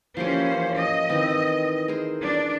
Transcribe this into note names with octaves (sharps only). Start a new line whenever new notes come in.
E3 F3 A#3 C#4 G4 C5
D#5
D#3 E3 C4
G#4 A#4 C5
D4